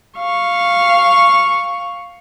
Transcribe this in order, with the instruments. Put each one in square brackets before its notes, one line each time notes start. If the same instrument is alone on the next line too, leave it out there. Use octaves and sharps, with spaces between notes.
[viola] F5 C#6